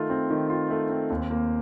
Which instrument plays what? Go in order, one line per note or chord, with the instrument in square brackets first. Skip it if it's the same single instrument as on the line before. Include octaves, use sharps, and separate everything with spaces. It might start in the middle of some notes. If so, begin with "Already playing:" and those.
Already playing: [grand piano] D#3 A3 F4
C4
D#3
F4
A3
C4
D#2
A#3